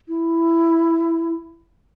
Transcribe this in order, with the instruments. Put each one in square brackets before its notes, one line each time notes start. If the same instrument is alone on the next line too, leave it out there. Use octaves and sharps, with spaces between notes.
[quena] E4